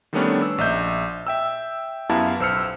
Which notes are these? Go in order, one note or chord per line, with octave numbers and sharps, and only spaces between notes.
D#3 G3 A3 B3 C#4 D4
E6
A#1 D#5 E5 G6
E5 G5 E6
F#2 B3 E4 G4 F5 A5
B1 C5 E6 F6 C#7